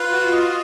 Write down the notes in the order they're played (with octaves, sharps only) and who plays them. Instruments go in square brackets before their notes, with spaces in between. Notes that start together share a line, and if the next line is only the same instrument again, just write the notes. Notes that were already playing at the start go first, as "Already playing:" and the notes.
Already playing: [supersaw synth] F4 [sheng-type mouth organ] B4
[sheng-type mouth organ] F#4
D#5